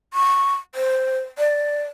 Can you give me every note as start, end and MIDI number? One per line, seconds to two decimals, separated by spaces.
0.14 0.54 85
0.75 1.19 72
1.38 1.82 74